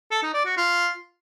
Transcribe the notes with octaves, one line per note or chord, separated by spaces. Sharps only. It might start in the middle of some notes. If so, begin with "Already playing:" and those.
A4
D#4
D5
F#4
F4